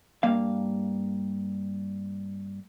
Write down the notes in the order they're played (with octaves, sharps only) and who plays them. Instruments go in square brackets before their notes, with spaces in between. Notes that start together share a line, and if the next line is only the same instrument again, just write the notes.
[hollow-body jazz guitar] G2 A#3 F5